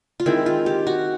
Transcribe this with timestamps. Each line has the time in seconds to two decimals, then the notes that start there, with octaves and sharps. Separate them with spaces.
0.20 F4
0.26 D#3 G#3 C4 E4
0.46 F4
0.66 G4
0.87 F#4